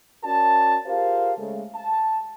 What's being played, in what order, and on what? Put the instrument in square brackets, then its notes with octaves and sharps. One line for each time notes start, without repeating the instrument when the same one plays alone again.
[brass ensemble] C#4 F#4 A#4 D5 A5
F4 G4 G#4 A#4 C5 F5
C#3 G#3 A3
A5